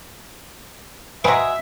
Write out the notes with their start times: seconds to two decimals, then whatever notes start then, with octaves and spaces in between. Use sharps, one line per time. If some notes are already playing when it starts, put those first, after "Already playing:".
1.24 F#3 G#3 G#4 B4 C5 E5 G5